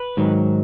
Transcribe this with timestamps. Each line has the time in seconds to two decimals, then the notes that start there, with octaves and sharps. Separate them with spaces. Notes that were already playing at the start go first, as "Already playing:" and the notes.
Already playing: B4
0.17 G#2 D#3 F#3